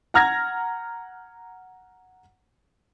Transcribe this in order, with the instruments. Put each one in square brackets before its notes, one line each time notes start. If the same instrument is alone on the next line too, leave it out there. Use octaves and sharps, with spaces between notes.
[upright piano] F#5 A#5 F6 G#6 A#6